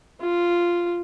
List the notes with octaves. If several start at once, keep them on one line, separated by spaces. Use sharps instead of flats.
F4